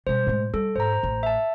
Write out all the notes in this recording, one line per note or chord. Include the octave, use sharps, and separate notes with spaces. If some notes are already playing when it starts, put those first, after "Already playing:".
B2 G3 C5
A2 G#3
G3 A4
G#2 C5 A#5
A1
E5 A5